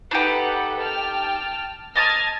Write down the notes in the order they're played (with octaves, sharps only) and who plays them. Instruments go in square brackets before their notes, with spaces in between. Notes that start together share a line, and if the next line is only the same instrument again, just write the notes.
[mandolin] D4 D#4 G4 [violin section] A4 B4 F#5
[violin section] G5 A5 F6
[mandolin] D#5 A5 D#6 [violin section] F6 G#6